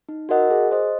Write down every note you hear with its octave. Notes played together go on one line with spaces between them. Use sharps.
D#4
F#4 A#4 D#5 F#5
G#4
C5 D#5